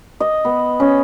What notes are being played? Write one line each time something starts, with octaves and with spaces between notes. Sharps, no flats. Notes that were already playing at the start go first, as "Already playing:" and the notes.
D#5
B3
C#4